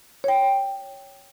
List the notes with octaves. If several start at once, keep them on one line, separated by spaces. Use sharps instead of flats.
C#5 G5